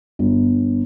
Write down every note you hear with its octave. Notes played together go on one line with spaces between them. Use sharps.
G1